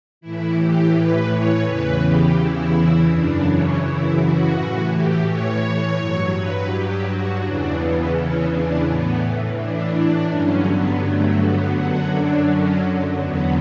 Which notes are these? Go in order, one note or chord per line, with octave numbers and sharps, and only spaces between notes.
A2 E3 E4
G4
B4
C#5
E2 C#3 E3 B4
G4
E4
F#2 C#3 E3 D4
C#4
E4
F#4
A2 E3
G4
C#5
G2 F#3
B4
G4
F#4
E2 C#3 E3 D4
B3
C#4
D4
A2 E3 B3
D4
D4
G2 D3 F#3 C#4
B3
A3
B3
F#2 D3 F#3 F#4
D4
C#4
E2 D3 F#3 B3